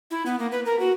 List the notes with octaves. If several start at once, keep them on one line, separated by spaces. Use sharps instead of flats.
E4
B3
A#3
B4
A#4
F#4